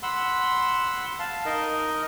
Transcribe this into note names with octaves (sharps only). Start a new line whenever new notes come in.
F#5 B5 C6 E6
F5 A5
D#4 A#4 D#5